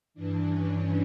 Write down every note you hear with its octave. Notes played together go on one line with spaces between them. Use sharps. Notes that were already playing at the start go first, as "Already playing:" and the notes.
G2 E3 D4
C#4